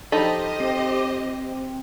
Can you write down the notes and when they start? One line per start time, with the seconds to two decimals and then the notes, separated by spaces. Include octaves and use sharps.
0.12 F3 D#4 G4 A4 C5 D#5 B5
0.60 C4